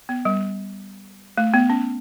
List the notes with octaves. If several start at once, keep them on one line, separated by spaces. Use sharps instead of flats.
B3
G3
A3
B3
C#4